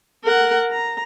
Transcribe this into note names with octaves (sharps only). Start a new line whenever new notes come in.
A#4 F#5
A#5